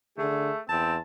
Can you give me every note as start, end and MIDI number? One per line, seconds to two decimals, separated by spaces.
0.18 0.50 50
0.18 0.59 57
0.18 0.59 68
0.69 0.98 40
0.69 0.94 60
0.69 1.01 81